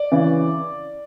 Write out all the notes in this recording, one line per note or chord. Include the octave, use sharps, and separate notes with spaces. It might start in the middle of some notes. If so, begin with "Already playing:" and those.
Already playing: D5
C#3 E3